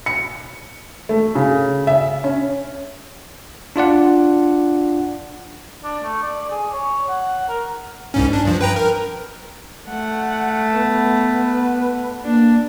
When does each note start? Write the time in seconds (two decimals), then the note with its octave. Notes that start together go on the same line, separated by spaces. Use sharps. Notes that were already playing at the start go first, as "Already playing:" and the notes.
0.06 C#7
1.09 A3
1.35 C#3
1.87 E5
2.24 C#4
3.76 D4 F4 D5 F#5
5.84 D4
6.03 A3
6.23 D5
6.50 G#4
6.73 C#5
7.09 F#5
7.48 A#4
8.14 C2 G#2 C#4
8.33 D4
8.45 G2 F3
8.61 B4 G5 A#5
8.76 A#4
9.89 A3 F#5
10.75 B3 B4
12.24 A#3 D4